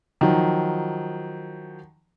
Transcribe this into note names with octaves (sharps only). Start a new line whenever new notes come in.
D#3 F3 F#3